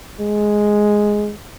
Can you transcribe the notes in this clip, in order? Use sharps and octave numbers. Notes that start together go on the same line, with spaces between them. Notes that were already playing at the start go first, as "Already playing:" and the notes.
G#3